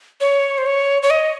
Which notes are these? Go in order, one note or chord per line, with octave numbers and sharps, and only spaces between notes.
C#5
C5
C#5
C#5
D#5